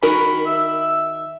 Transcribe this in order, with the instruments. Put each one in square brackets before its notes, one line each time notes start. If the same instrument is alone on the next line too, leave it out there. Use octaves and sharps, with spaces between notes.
[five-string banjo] D#3 F#4 A#4 [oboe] B5
[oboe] E5